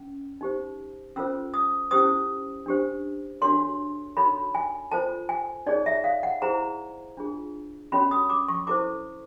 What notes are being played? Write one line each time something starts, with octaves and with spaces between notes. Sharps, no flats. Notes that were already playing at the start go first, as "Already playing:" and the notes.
Already playing: C#4
D#4 G4 C5
C#4 F4 A4 C5 E6
D#6
C#4 E4 G4 C5 D#6
D4 G4 C5
D4 F#4 A4 C#5 C6
D#4 F#4 A4 C#5 B5
G#5
F4 A4 C5 A5
G#5
D#4 G#4 C#5 D5
E5
F5
F#5
E4 G#4 C5 A#5
D4 F4 G#4
C#4 F#4 A4 C#5 B5
D#6
D6
C#6
E4 A4 C5 D6